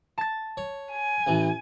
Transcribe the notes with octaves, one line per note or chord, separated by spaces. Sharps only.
A5 A6
C#5
G#5
A1 E3